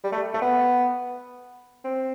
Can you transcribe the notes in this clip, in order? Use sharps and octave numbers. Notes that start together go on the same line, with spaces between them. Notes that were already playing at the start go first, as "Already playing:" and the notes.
G3
A3
A3
B3
C4